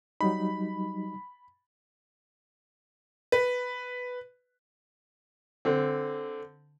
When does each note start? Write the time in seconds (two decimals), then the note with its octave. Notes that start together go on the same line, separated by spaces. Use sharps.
0.21 F#3 G3 D#4 B5
3.32 B4
5.65 D3 C4